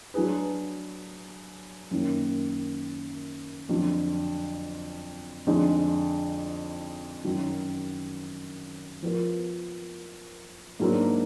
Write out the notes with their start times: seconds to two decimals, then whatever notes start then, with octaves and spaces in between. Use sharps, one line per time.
0.14 F#3 D4 G#4 B4
1.91 F#2 D#3 A#3
3.69 F2 D3 F#3
5.47 F2 D3 G#3 D#4
7.24 F#2 D#3 F#3
9.02 F3 B3 F4 A#4
10.80 G#2 F#3 A#3 D4